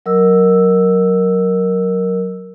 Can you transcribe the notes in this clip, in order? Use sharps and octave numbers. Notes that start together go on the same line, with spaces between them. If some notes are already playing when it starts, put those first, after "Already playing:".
F#3 A#4 D#5 E6